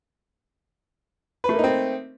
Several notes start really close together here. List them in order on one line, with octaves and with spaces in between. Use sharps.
B4 A3 A#3 D#4 C4